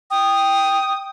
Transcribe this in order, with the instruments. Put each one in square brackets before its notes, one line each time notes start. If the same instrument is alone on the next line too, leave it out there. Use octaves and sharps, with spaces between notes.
[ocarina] G5 [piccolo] D#6